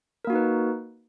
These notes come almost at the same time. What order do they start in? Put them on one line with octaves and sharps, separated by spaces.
A#4 A#3 F#4 D#4 B4